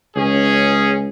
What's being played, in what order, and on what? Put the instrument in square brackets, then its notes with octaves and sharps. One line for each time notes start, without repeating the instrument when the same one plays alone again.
[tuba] C#2 [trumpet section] C#4 G#4